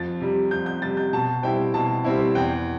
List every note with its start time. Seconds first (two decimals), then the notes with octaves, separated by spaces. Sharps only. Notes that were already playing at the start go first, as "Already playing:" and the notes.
Already playing: F2 A6
0.21 C3 G3
0.51 F2 G6
0.66 G6
0.82 C3 G3 A6
0.97 G6
1.13 B2 A5
1.43 G3 C4 E4 G5
1.74 B2 A5
2.04 G3 C4 E4
2.35 E2 G5